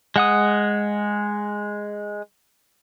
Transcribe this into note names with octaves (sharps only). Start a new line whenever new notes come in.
G#3 F#5 D#6